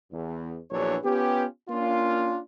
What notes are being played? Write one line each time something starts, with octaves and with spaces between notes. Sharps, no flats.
E2
A#1 E2 E3 F#3 D4 C#5
B3 C#4 F4 G4
A#3 C#4 D4 F4